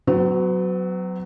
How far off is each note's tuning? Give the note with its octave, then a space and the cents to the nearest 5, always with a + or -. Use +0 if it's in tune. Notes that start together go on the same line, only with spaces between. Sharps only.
F#3 +0 B3 +40